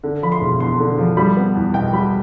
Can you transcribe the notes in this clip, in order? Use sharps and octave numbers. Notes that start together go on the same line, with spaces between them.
D3
F3 B5
C6
E1
E2 C6
D3
F3
G3 B5
B3
E2
B2 G5
G3 B5